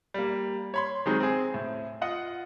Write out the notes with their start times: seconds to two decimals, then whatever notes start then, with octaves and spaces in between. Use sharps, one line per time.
0.14 G3 A#3
0.74 C#5 B5 C6
1.06 D#3 F#3 G#3 C4 D#4
1.20 C4 G#4
1.54 A2
2.01 F4 D#5 F#5